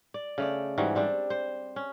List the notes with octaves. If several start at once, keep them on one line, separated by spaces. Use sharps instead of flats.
D5
C#3 A3 D5
G#2 E3 G3 F#4
G3 C4 D4
C5
C#4